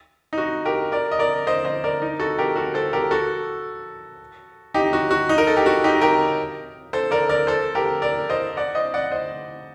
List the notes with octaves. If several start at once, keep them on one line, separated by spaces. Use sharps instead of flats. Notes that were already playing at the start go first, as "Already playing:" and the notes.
D#4
F#4
G4 A#4
A#4 D5
D#5
A#4 D5
C5 D#5
C5 D#5
A#4 D5
D#4
F#4 A4
G4 A#4
F#4 A4
A4 C5
G4 A#4
F#4 A4
D#4 G4
F#4
F#4
D#4
A#4
A4
G4
F#4
D#4 G4
G4 A#4
A4 C5
A#4 D5
A#4 D5
A4 C5
G4 A#4
A#4 D5
C5 D#5
D5 F#5
C5 D#5
D5 F#5
C5 D#5